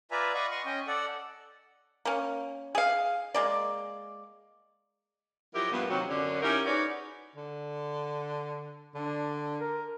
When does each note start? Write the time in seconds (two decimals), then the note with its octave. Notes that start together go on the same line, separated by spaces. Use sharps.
0.11 F4 B4 D5 E5 G#5 A#5
0.34 D5 D#5 F5 F#5 B5 C#6
0.51 D#5 C6 C#6
0.65 C#4 D#5 G5
0.87 A4 D5 F#5
2.05 A#3 C#4
2.75 G#4 F5
3.34 G#3 A#3 D5
5.55 F3 F#3 E4 G4 A#4 D#5
5.71 G2 A#2 B3
5.90 C3 D#3 F3 F#3
6.08 F#2 D3 C#4
6.43 C#4 D#4 E4 G4 A#4
6.66 D#4 F#4 G#4 B4 C#5 D5
7.36 D3
8.95 D3 D4
9.61 A#4